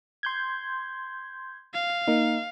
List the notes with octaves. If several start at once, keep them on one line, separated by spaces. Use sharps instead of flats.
C6 G6 G#6
F5
A#3 D#4